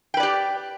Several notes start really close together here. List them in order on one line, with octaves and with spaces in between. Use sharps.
G5 B4 D5 G4